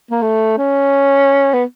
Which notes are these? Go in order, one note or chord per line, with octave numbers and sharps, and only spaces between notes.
A#3
A3
C#4
B3